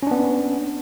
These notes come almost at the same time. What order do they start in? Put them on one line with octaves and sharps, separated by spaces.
C#4 D4 B3